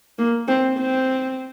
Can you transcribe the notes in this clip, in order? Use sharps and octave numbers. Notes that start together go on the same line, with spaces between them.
A#3
C4
C4